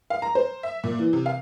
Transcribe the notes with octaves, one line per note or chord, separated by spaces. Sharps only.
F5
A#5
C5
E5
A#2
E3
C3
F5